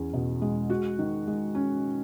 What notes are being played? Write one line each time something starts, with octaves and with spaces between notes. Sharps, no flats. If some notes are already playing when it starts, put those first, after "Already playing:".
Already playing: E2 C#4
B2
G#3
F#4
D#3
G#3
C#4